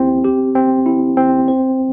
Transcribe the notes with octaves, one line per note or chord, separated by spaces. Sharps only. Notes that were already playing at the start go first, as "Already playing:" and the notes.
Already playing: C4 E4 G4 C5
G4
C4
E4
C4
C5